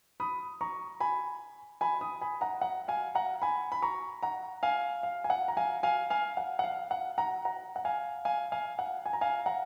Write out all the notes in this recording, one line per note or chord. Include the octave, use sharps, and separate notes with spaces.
B5 D#6
A#5 C#6
G#5 B5
G#5 B5
B5 D#6
G#5 B5
F#5 A#5
F#5
F5 G#5
F#5 A#5
G#5 B5
B5
A#5 C#6
F#5 A#5
F5 G#5
F5
G#5
F#5
A#5
F5 G#5
F5 G#5
F5 G#5
F#5
F#5
F5
F#5
F#5 A#5
F#5 A#5
F#5
F5 G#5
F5 G#5
F5 G#5
F#5
G#5
A#5
F5 G#5
F#5 A#5